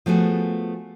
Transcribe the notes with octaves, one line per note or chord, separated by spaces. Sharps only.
F3 A3 B3 F#4 G#4